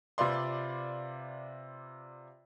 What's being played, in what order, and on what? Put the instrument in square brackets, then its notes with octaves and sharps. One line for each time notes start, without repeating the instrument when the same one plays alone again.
[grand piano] C3 F4 B4 D5 C6